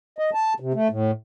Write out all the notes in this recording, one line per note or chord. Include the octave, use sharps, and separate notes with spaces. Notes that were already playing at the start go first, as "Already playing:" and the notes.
D#5
A5
C3
A3
A2